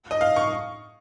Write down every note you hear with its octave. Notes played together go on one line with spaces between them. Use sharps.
D#5
F5
C#6